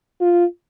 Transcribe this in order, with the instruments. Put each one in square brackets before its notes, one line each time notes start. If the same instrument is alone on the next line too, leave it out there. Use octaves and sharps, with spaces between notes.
[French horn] F4